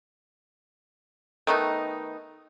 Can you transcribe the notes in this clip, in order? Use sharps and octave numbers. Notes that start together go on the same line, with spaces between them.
D#3 A3 B3 D#4